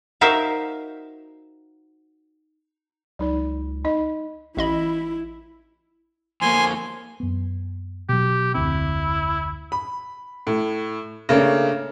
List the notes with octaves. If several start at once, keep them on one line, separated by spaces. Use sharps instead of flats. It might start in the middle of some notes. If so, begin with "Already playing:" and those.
D#4 F#4 A#4 C5 E5 F5
C#2 F#3 D#4 D5
D#4 D#5
A1 E4 D#5 B5
F2 A#3 G#5 C6
F#2 B3
B2 F#3 G4
F1 D2 C4 E4
B5
A2
C#3 A3 A#3 C#4 D4